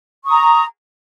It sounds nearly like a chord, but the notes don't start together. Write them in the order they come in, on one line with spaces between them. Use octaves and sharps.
C#6 D#6 A#5